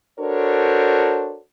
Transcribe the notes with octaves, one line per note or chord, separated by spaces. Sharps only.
D4 F#4 A4 A#4 C5 C#5